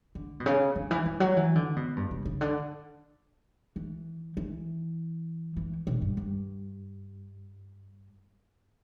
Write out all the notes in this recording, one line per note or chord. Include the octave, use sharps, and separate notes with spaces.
D3
B2
C#3
D3
E3
E3
F#3
E3
D3
B2
G2
C#3
C#3
D3
E3
E3
E3
B2
G2
G2